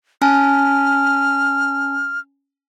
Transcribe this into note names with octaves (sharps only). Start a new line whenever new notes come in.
C#4 G#5 A5 F6